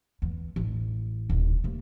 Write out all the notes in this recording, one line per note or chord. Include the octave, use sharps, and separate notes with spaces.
E2
A1
D#1 C2
C3 A#3